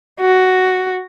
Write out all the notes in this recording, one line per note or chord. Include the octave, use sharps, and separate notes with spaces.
F#4